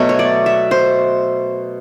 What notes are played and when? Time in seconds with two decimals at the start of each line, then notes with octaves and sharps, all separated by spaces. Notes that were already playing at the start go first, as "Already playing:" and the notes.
Already playing: B2 F#3 A3
0.09 C#5
0.19 D5
0.46 E5
0.71 C5